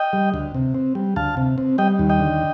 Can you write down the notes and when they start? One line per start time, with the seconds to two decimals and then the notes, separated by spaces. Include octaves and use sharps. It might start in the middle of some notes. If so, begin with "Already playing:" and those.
Already playing: D#5 G5
0.13 G3
0.34 D2
0.55 C3
0.75 C4
0.95 G3
1.16 D2 F5 A5
1.37 C3
1.58 C4
1.78 G3 D#5 G5
1.99 D#2
2.09 D#5 G5
2.19 D3